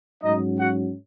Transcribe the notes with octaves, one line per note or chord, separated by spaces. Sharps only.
G#2 F#3 C#4 D#4 D#5
F#4 F#5